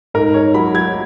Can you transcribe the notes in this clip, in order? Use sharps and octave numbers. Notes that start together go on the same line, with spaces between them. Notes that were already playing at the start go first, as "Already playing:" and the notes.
G#2 A#4
G#2 C#5
F#3 B5
F#3 G#6